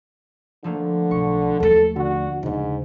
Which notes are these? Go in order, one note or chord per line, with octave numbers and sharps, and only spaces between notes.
D3 F3 A3 A#3
B1 C#6
D#2 A3 A4
D3 F#4
D#2 G#2 C#3